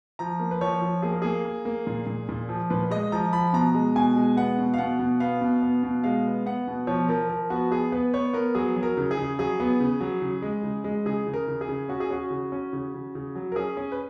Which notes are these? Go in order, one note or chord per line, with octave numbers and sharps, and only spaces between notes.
F3 A#5
A#3
B4
F3 C#5
F3
A#3 G#4
A#4
A#3 G#4
A#3
A#3
A#2
A#2
A#2
F3
A#2 B4
G#3 D#5
F3 A#5
F3 B5
B2 A#5
G#3
B2 G#5
G#3
B3 F#5
B2
F5
B2 F#5
B2
B3 F5
B2
B3
B2
G#3 F5
B3
B3 F#5
B2
F3 C#5
F3 A#4
F3 A#4
B3 F#4
B3 G#4
B3 B4
B3 C#5
B3 A#4
F#3 G#4
F#3
A#4
C#3
G#4
C#3
F#3 G#4
B3
C#3
F#3
C#3
G#3
C#3
G#3
C#3 G#4
C#3
A#4
C#3
G#4
C#3
C#4 F#4
G#4
C#4 F#4
C#3
C#4
C#3
C#3
C#3
F#3
A#4
C#4 G#4
C#4
B4